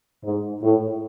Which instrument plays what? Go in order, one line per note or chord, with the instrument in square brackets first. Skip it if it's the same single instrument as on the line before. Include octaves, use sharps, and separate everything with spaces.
[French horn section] G#2
A2